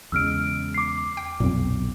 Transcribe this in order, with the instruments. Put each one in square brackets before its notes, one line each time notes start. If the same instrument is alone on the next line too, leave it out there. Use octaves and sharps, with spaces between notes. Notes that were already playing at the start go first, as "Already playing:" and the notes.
[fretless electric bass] E2 C#3 G#3 [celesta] E6 F6 D7
[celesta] D6 C7
[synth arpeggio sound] G5
[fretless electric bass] B1 [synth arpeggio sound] F2 A#2